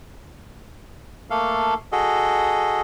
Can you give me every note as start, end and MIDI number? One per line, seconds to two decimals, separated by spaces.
1.30 1.74 57
1.30 1.74 58
1.30 1.74 69
1.30 1.74 77
1.92 2.82 66
1.92 2.82 68
1.92 2.82 69
1.92 2.82 75